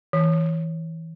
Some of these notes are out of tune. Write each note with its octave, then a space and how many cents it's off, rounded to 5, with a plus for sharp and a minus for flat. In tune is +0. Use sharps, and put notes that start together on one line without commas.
E3 -20